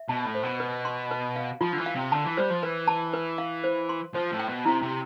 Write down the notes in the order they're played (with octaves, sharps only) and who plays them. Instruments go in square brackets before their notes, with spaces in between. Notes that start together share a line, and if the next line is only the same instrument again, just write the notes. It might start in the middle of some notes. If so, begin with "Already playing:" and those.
Already playing: [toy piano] E5
[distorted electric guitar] B2 [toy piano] A5
[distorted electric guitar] A2
[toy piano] C5
[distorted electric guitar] B2
[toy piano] B4
C6
B4
F5
[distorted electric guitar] F3 [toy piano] F4
[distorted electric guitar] D3
E3
[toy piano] F5
[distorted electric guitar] C3
[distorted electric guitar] D3 [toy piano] A5
[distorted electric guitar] E3
[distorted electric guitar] G3 [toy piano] C5
[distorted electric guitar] F3
[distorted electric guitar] E3 [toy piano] B4
[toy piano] A5
B4
F5
C5
C6
[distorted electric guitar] F3 [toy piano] C5
[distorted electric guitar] A2
[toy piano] G5
[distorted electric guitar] B2
[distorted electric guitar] C3 [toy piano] E4
[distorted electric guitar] C3